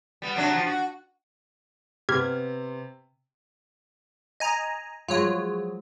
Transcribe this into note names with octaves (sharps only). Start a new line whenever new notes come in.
G3 B3
C3 F#3 D4
F3
F#4
C3 B3 G4 F6 G#6 B6
D#5 G#5 A#5
F3 F#3 G#3 F4 C#5